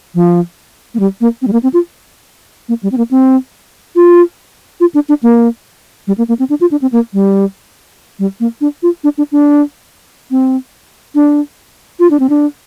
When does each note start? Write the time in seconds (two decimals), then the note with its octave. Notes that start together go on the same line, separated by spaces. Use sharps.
0.15 F3
0.94 A#3
0.99 G3
1.21 A#3
1.42 C4
1.47 G3
1.53 A#3
1.63 C4
1.74 F4
2.69 A#3
2.83 G3
2.92 C4
2.97 A#3
3.11 C4
3.96 F4
4.80 F4
4.94 D4
5.09 D4
5.23 A#3
6.07 G3
6.18 A#3
6.28 A#3
6.39 C4
6.50 D4
6.61 F4
6.71 D4
6.82 C4
6.92 A#3
7.13 G3
8.19 G3
8.40 A#3
8.61 D4
8.83 F4
9.04 D4
9.18 D4
9.32 D4
10.31 C4
11.15 D4
12.00 F4
12.10 D4
12.20 C4
12.29 D4